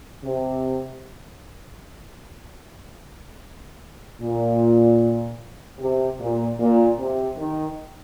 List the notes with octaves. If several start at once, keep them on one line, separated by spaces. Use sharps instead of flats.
C3
A#2
C3
A#2
A#2
C3
D#3